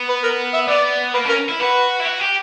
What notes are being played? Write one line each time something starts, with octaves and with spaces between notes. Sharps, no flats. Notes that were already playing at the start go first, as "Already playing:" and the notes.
Already playing: B3
B4
A#4
E5
B3 D5
A#3 B4
C#4 A#4
E4
F#4 B4
E4
F#4
G4